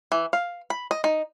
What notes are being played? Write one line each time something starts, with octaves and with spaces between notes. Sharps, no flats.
E3
F5
B5
D#5
D#4